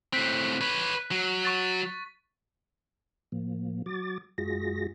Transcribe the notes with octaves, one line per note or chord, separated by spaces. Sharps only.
A2 C4 F#6 B6
B4 C#5
F#3
C#6 A6
A2 F3 A#3
F#3 F#4 D6 A6
F#2 G#3 F4 F#4 G#4 A#6